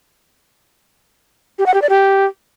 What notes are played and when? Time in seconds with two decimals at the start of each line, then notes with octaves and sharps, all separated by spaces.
1.59 G4
1.66 F#5
1.74 G4
1.82 D5
1.90 G4